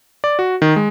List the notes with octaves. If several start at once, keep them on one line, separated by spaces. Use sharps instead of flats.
D5
F#4
D#3
G#3